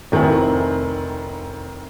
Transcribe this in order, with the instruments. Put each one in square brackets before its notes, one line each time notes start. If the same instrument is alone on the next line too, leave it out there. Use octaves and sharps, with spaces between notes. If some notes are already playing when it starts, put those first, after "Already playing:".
[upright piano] F1 D#3 C4 E4 G#5